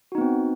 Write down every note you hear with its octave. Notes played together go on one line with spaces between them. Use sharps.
B3 C4 D#4 F#4